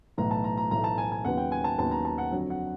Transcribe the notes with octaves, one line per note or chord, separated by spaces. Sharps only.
B1 A2 E3 A3 A#5
A5
A#5
A#5
B1 A2 E3 A3 A#5
A5
G#5
G#5
D#2 C#3 F#3 B3 F#5
G5
G#5
A5
D#2 C#3 F#3 B3 A5
A#5
A5
F#5
F2 D3 F#3
F#5